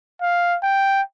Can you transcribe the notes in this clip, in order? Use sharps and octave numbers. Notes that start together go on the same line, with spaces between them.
F5
G5